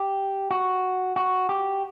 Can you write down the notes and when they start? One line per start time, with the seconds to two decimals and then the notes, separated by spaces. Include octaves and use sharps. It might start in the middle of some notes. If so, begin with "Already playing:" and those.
Already playing: G4
0.51 F#4
1.16 F#4
1.49 G4